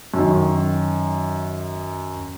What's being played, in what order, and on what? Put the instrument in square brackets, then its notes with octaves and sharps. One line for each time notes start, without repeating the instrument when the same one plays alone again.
[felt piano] F#2 D#3